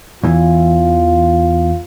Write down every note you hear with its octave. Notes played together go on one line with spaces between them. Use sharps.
E2 E3 F4